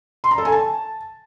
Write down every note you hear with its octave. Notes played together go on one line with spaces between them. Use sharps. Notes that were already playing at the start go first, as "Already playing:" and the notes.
C6
A#5
A4
G#5
A5